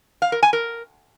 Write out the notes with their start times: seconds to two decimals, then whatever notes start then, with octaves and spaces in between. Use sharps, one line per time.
0.22 F5
0.32 A#4
0.43 G#5
0.53 A#4